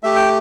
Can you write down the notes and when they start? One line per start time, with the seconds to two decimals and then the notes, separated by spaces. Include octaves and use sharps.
0.03 A3 G4 E5
0.16 G5